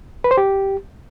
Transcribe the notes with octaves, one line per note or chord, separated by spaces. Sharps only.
B4
C5
G4